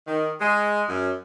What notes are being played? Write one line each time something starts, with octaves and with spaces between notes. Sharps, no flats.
D#3
G#3
F#2